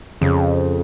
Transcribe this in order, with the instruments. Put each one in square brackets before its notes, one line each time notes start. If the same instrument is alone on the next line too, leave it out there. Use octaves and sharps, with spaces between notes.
[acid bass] F2 [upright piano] C#3